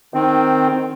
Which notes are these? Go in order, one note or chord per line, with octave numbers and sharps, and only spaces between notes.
D#3 C4